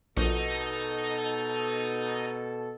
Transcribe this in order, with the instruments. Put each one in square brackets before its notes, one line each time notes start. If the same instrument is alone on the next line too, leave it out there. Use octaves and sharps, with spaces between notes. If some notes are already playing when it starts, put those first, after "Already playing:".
[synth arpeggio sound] A#1 [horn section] B2 A4 [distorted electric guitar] D#4